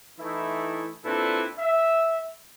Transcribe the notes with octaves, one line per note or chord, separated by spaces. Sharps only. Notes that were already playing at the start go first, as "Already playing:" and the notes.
E3 A3 D#4 E4
A#2 C4 D4 E4 A4 B4
E5